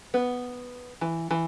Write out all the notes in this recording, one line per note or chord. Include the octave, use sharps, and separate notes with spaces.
B3
E3
E3